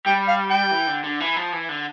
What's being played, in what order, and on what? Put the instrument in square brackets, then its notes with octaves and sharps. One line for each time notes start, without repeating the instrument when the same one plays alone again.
[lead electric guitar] G3 [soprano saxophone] G5
[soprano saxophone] F5
G5
[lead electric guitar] E3
D3
D3
E3
F3
E3
D3